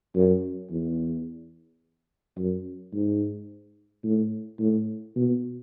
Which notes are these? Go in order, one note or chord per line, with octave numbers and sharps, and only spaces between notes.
F#2
E2
F#2
G#2
A2
A2
B2